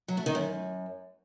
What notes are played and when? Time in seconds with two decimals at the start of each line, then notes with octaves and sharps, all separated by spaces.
0.08 F#3
0.17 A3
0.26 D#3
0.35 F#2